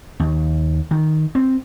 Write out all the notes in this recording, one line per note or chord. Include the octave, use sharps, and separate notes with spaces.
D#2
D#3
C4